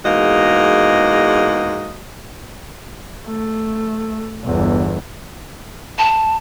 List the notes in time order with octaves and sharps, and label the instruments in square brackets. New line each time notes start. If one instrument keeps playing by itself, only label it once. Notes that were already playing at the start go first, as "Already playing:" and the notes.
[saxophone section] E2 G#2 A#3 F#4 D#5
[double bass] A3
G1 E2
[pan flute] A5